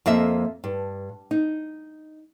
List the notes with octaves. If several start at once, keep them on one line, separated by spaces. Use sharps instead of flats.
F2 A#3 D#5 E5
G2
D#4